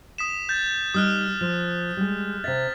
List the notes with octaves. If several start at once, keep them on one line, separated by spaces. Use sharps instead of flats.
D#6 B6 E7
G6 A6
G3 D#4 D#6 F6 F#6
F3
G3 G#3
C3 E5 A6 B6